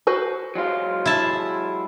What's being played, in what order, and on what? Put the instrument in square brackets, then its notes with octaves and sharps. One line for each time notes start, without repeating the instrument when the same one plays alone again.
[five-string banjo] F#4 B4 C5
[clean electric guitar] F#3 G#3 F4
[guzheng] E4 A5